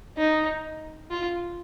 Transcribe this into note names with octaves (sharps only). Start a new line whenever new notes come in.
D#4
F4